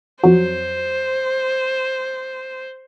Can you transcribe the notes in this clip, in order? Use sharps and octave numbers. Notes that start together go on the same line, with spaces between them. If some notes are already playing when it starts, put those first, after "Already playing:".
F2 F#3 C5